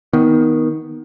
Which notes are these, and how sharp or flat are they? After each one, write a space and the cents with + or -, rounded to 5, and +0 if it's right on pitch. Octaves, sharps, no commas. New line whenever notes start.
D#3 +15 B3 +0